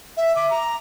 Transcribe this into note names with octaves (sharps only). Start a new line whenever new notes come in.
E5
D6
A#5